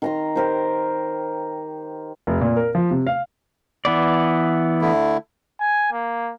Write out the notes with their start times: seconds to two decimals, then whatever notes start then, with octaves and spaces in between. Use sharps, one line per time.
0.02 D#3 A#5 C6
0.35 G4 A#4 C5
2.27 F1
2.41 A#2
2.56 A#4
2.75 F3
2.91 C3
3.07 F5
3.85 E3 B3 D5
4.82 D3 A3 E4
5.60 G#5
5.92 A#3